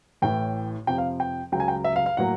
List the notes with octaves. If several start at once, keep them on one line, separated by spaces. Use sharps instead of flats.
A1 A2 E3 G5
F2 C3 F3 G5
F5
G5
C#2 C#3 F#3 G5
G#5
G5
E5
F5
F5
A2 F#3 A#3 F#5